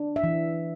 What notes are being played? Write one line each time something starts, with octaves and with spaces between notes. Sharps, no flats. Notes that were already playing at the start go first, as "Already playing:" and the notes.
Already playing: D4
E5
E3